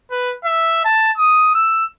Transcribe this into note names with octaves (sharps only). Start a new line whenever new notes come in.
B4
E5
A5
D#6
E6